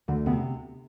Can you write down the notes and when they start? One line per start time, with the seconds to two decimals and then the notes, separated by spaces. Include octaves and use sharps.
0.08 D2 D3
0.26 C3 B3